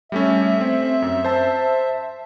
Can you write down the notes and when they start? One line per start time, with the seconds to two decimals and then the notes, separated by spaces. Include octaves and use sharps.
0.12 G3 A3 C#4 E5
0.61 C4
1.02 F#2
1.24 C5 A5 E6